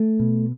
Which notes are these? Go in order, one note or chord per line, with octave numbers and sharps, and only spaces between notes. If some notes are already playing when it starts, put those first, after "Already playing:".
Already playing: A3
B2